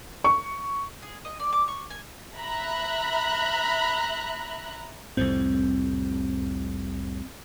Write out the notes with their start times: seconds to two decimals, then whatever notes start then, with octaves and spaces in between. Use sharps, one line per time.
0.24 C#6
1.02 G#4
1.25 D#5
1.40 D5
1.53 D6
1.68 C#6
1.90 G#5
2.36 E5 A#5 B5 F#6
5.17 C2 F2 A2 C4